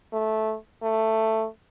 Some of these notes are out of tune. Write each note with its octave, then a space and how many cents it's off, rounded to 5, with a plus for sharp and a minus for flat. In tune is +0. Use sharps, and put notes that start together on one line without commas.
A3 -10
A3 +10